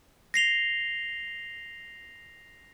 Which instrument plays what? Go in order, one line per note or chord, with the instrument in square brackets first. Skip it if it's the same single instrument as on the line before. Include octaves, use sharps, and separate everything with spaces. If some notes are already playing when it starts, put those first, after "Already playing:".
[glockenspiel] A#6 C7 F7 G7